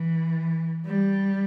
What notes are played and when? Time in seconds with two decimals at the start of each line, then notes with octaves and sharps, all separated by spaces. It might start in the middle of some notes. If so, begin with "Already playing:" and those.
Already playing: E3
0.86 G3